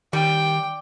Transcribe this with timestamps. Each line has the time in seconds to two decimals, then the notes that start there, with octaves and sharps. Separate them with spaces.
0.13 D#3 G3 G5